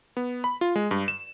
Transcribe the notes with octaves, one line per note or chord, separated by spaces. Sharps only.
B3
B5
F4
G#3
G2
E7